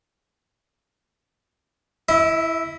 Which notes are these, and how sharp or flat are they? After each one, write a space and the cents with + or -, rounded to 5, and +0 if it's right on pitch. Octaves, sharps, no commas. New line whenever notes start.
E4 +0 E5 -45